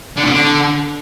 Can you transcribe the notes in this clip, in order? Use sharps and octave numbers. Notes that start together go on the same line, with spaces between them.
D3
B2
D3